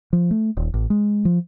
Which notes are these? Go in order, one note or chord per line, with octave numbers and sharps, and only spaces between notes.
F3
A3
D#1
A1
G#3
F3